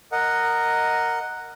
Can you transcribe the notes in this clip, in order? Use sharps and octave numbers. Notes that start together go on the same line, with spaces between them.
A#4 D#5 F#5